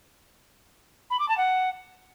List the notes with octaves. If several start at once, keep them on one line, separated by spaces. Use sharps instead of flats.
B5
D6
A5
F#5